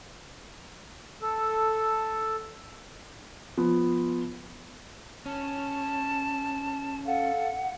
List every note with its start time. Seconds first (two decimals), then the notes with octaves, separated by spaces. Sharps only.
1.22 A4
3.58 F3 B3
5.26 C#4 A5
7.06 A4 F5 F#5